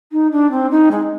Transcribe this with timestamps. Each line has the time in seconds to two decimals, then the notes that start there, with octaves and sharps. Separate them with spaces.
0.12 D#4
0.32 D4
0.51 C4
0.71 D#4
0.91 G#3